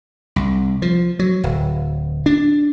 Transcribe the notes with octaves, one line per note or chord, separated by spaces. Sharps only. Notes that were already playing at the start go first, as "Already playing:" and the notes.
C2
F3
F#3
D1
D4